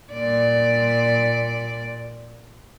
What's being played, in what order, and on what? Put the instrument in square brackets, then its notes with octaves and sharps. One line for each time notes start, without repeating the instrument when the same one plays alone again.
[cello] A#2 D5